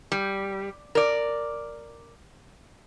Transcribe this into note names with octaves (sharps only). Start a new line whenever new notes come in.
G3
A#4 D5